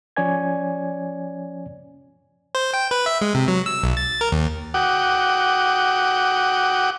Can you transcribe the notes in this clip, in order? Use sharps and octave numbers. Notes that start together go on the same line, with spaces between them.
F3 C#4 C#5 D5 G#5 G#6
C5
G5
B4
E5
G#3
C3
F#3
E6
B1
A6
A#4
D#2
F#4 F#5 G5 D6 D#6